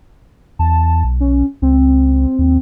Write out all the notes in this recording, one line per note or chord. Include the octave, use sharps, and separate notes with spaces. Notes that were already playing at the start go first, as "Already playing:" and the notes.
E2 A5
B1
C#4
C#2 C4
D#2